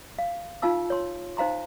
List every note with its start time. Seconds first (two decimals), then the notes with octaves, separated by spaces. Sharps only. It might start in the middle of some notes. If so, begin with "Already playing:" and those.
0.19 F5
0.62 D#4 F4 F5 A5 E6
0.90 C#5 C6
1.37 D#4 C5 F5 A#5 C6